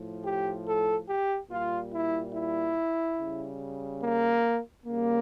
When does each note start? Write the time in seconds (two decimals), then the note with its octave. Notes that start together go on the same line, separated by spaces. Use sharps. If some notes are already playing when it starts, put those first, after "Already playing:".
Already playing: A2 F3
0.24 G4
0.66 A4
1.09 G4
1.50 A#2 G3 F4
1.92 E4
2.33 E4
3.18 C#3 G3
4.02 A#3
4.86 C#3 G3 A#3